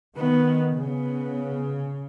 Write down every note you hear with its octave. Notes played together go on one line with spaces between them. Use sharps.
D#3 B3
C#3 B3